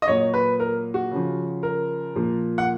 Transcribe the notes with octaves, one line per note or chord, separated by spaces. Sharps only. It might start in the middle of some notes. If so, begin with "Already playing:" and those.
D#5
A#2 F#3 C#5
B4
A#4
F#4
C#3 F3
A#4
A#2 F3
F#5